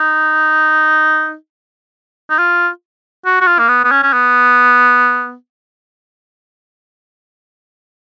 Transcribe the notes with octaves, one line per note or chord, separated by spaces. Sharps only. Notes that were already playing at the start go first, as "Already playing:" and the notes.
Already playing: D#4
D#4
F4
F#4
F#4
F4
A#3
B3
B3
C#4
C#4
B3